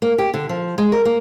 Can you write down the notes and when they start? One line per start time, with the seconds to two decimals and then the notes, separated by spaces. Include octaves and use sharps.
0.02 A#3
0.18 G4
0.34 D3
0.49 F3
0.78 G#3
0.92 A#4
1.05 A#3